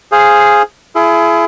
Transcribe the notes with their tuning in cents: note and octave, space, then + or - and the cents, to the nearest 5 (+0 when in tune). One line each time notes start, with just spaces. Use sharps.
G#4 +0 C5 +0 F5 -15
E4 +35 G#4 +30